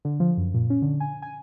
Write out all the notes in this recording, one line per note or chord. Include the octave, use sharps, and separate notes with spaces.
D3
F3
F#2
A#2
C#4
D3
G#5
G#5